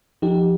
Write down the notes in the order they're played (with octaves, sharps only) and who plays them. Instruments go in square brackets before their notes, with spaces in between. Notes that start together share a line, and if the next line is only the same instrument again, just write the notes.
[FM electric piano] F3 D#4 G4